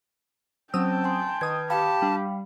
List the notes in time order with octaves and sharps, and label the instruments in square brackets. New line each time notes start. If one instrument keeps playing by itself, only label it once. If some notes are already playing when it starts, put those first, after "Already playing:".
[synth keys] F#3 D#6 E6 [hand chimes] C4 C#4 C5 [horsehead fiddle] G5 A5
[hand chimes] G#5 C6
[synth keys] D#3 D#6 [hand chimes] B4 G#6
[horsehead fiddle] G4 [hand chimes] F5 G5 B5 [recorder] A5
[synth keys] G3 D4